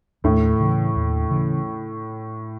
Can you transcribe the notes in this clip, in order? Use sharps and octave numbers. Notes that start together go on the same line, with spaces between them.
D#2 A2 A3
C#3 E3
D#2
C#3 E3